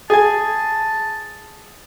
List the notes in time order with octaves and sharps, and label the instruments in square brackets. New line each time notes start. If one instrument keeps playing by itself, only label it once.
[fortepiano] G#4 G#5 [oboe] A5